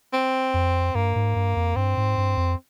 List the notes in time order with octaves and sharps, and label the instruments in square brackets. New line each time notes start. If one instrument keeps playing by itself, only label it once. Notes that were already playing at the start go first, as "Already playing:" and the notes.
[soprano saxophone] C4
[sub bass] F2
[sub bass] G2 [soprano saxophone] A#3
[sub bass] G#2
G2
F2
[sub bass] G2 [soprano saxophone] C4
[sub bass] G#2
G2
F2